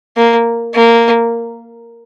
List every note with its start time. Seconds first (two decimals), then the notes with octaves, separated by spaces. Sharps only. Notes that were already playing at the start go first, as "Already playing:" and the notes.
0.17 A#3
0.74 A#3